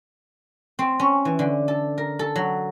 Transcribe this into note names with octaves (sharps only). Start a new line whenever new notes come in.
C4
C#4
E3
D3
A4
A#4
A4
F#3